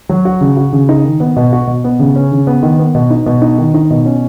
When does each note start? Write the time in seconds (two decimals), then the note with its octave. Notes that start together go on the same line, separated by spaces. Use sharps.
0.09 F#3
0.25 F#4
0.41 C#3
0.57 F#4
0.73 C#3
0.89 D#4
1.05 D#3
1.20 B3
1.36 B2
1.52 F#4
1.67 B2
1.84 B3
1.99 C#3
2.16 C#4
2.32 C#3
2.47 B3
2.63 D#3
2.79 B3
2.95 B2
3.10 D#4
3.26 B2
3.42 D#4
3.58 D#3
3.74 D#4
3.90 B2
4.05 C#4